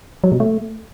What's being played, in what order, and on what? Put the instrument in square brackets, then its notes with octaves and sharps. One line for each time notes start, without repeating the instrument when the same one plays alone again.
[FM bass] F#3
B2
A3